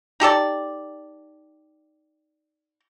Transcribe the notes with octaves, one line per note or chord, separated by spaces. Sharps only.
D#4 G4 A4 D5